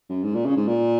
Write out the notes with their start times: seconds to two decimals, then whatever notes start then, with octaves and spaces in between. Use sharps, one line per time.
0.10 F#2
0.24 G#2
0.35 A#2
0.46 C#3
0.57 G#2
0.68 A#2